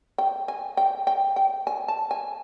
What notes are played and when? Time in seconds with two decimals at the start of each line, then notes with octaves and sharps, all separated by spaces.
0.18 G5
0.48 G#5
0.77 G5
1.07 G5
1.36 G5
1.67 G#5
1.88 A5
2.11 G#5